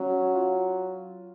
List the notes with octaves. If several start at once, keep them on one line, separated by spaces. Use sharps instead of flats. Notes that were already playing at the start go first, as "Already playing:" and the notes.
Already playing: F#3 C#4
F4